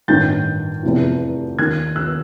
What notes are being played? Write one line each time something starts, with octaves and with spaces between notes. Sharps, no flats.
A1 G2 D#3 G6 A6
F1 E2 C3 E3
D#2 D#3 F#6 G#6
E6 F#6